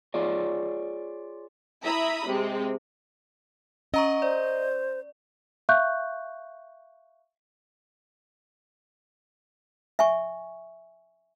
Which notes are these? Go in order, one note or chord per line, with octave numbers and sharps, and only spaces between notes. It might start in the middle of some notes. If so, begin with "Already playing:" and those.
F4 G#4 C#5 D5
E4 E5 A#5 B5 D#6
C3 G#3 C4
C#4 D#5 A#5 C#6
C5 D5
E5 F5 C#6 F#6 G6
E5 G#5 C#6